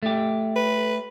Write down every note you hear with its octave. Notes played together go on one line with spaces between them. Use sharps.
A3 G4
B4